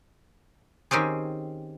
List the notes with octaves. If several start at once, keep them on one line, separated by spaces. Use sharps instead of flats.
D#3 C4 C#4 G4 G#4